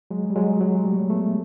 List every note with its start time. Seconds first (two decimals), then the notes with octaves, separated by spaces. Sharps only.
0.10 F#3 G#3
0.30 G3
0.35 F#3 G#3
0.60 F#3 G#3
0.85 G3 A3
1.09 A3 B3